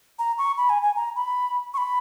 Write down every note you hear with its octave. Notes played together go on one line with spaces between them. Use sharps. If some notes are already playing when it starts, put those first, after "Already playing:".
A#5
C#6
B5
G#5
G#5
A#5
B5
C#6
B5